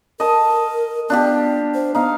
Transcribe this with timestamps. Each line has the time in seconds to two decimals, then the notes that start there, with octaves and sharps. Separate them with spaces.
0.20 A#4 D#5 A5
1.10 B3 D4 F4 G4
1.74 C5
1.95 B3 D#4 F5